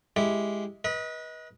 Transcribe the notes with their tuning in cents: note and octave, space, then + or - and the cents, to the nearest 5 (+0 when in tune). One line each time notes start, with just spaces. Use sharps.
G#3 +0 E4 +0 G4 +0
B4 -30 D#5 +25